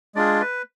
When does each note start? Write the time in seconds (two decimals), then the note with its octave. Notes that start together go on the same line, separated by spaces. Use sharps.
0.15 G#3 D4 F4 G#4 D5
0.41 B4